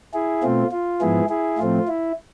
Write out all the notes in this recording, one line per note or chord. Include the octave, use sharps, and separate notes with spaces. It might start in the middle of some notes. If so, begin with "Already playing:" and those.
E4 G#4
B2 A3 C4 F4
F4
G#2 F3 B3 E4 G#4
E4 G#4
A2 F3 A3 C4 F4
E4